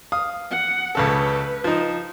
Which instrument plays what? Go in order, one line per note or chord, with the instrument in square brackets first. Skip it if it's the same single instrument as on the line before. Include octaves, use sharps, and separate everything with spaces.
[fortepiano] F5 D#6
[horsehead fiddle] F#5
[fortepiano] C#2 C#3 A4 [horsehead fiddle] B4
[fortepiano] F3 D#4